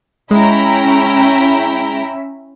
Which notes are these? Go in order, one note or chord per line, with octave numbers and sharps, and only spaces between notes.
G#3 C#4 E4 E5 G5 A#5